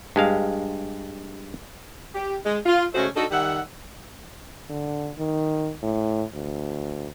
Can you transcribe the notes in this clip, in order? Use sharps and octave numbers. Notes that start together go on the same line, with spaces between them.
G2 G#3 F5
G4
G#3
F4
C#3 G#3 A3 C#4 F#4 C5
D4 D#4 F#4 A4
D#3 G3 E5 F#5
D3
D#3
A2
D2